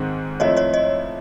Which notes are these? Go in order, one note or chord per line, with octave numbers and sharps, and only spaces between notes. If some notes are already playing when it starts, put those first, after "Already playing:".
Already playing: G#2 D#3 G#3 C4
F3 A3 C4 E4 C#5 D#5
C#5 D#5
C#5 D#5